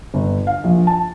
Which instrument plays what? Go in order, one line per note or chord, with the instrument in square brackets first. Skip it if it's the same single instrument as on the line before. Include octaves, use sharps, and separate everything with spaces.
[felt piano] G1
F5
A#1
A5